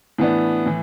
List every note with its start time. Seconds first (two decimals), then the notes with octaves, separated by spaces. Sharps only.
0.18 A2 E3 B3 D4
0.66 A2 E3